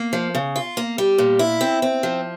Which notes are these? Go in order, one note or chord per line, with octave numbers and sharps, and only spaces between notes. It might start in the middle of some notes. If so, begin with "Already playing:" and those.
Already playing: A#3
F3
C#3
F4
A#3
G3
A#2
E4
C4
C4
F3